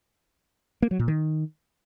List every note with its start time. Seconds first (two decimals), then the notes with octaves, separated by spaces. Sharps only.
0.82 A#3
0.91 F#3
0.99 A#2
1.08 D#3